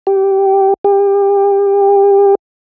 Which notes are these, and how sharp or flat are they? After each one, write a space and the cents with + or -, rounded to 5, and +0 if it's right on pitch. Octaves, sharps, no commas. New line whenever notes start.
G4 -10
G4 +30